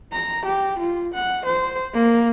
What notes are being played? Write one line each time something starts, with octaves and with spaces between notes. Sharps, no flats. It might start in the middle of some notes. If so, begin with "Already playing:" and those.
A#5
G4
F4
F#5
C5
A#3